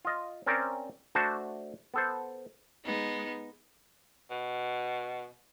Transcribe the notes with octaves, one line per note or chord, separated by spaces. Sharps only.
F4 D#5
C4 C#4 A#4 C5 D5
A3 D4 F#4 C5 A5
B3 A4 C5
G#3 B3 D#4
B2